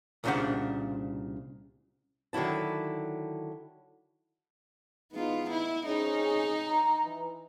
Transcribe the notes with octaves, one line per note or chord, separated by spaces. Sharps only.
C2 A#2 C#3 D4 C5 F#5
D3 D#3 F#3 E4 A5
E3 G#3 B3 D#4 F4
E4
C4 C#4 D#4 G#4
A#5
E3